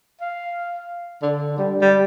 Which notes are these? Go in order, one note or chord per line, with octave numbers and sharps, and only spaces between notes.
F5
D3
G3
G3